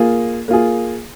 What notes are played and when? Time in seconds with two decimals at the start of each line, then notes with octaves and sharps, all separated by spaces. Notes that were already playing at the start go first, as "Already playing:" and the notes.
Already playing: A#3 F4 G#4
0.48 A#3 F4 G#4